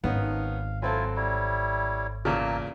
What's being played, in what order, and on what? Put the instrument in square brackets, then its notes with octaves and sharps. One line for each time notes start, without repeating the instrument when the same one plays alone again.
[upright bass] G#1 [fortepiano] B3 C#4 D#4 [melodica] F5
[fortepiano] F#3 C4 A4 [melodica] E4 F4 G#5
[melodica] G3 E4 C#5
[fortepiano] E2 A#2 C#3 [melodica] A#3 A5 E6